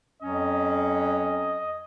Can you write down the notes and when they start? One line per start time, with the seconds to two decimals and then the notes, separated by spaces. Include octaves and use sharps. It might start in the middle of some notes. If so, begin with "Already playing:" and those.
0.23 F2 F#3 C#4 D#5